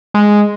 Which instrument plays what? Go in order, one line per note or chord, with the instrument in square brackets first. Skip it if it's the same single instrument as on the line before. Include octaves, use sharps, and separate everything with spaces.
[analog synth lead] G#3